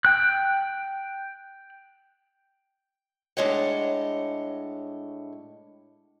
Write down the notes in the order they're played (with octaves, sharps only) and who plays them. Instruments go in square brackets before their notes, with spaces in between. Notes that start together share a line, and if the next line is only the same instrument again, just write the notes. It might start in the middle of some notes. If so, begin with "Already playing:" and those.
[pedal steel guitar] G5 F#6
[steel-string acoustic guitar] A2 G#3 D4 C#5 D#5 F#5